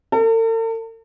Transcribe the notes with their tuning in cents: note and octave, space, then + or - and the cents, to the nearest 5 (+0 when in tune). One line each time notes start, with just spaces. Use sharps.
A4 +45